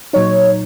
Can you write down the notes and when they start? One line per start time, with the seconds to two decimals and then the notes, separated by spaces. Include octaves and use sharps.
0.13 A#2 F#3 D#4 C#5